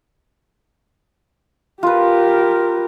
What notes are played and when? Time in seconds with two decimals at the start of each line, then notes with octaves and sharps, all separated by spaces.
1.83 F4 G4 A#4 B4